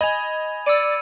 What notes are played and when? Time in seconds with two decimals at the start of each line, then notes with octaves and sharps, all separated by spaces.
0.01 D#5 G#5 B5 G#6 F7
0.66 D5 E6 C#7 D#7